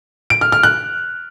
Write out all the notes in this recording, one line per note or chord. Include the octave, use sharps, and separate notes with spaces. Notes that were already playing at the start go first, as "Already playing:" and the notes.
D7
F6
F6
F#6